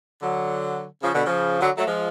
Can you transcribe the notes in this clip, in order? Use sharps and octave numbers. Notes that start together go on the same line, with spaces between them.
D3 F#3
C#3 F3
B2 D3
C#3 F3
D3 F#3
F#3 A3
F3 G#3